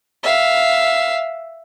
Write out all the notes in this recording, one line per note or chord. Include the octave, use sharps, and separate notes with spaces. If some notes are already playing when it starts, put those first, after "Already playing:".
E5 F5